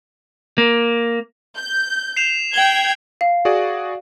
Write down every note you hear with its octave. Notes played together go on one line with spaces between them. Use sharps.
A#3
G6
C7 E7 F7
G5 G#6 F#7 G7
F5
F#4 G#4 D5